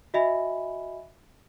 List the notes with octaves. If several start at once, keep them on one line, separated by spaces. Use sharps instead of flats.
F#4 D#5 E5 G#5 B5